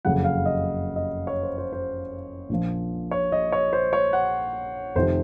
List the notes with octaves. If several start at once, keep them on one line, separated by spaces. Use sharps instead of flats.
F#1 F2 C#3 F#3 F#5
F5
D#5
D#5
C#5
C5
C5
C5
A#1 A#2 F3
C#5
D#5
C#5
C5
C#5
F#5
F1 F2 C3 D#3 C5